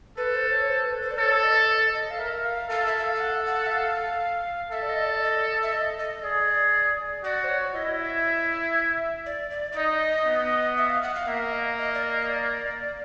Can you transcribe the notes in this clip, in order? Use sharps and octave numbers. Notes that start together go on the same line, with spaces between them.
A4 B4
C5
C#5
C5
B4
C5
D5
A4 C#5
D#5
D#5
F5
A#4 E5
F5
A4 F5
E5
E5
F5
F5
F#5
F#5
E5
F5
A4 E5
D5
D#5
D5
D#5
E5
D#5
D#5
G#4 D5
F#4 D5
C5
C#5
E4 D#5
E5
D5
D5
D5
D#4 D#5
B3
E5
F5
F#5
F5
A#3 E5
D#5
D#5
D5
D#5
D#5
D5